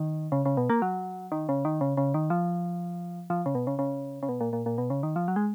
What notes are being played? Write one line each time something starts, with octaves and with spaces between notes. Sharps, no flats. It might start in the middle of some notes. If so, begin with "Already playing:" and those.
Already playing: D#3
C#3
C#3
B2
A#3
F#3
D#3
C#3
D#3
C#3
C#3
D#3
F3
F3
C#3
B2
C#3
C#3
C#3
B2
A#2
A#2
A#2
B2
C#3
D#3
F3
F#3
G#3